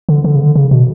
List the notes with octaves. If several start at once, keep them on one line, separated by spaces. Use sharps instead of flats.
D3
D3
C#3
D3
C#3
B2